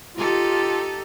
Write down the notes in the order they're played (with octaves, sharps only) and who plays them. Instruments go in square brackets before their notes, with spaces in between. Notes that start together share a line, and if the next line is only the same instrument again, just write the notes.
[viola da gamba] D#4 G4 A4 [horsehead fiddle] F4